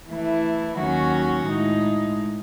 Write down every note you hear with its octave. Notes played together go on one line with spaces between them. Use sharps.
E3 A3 E4
D#2 D#3 F#3 C#4 F#4
A2 G#3 D#4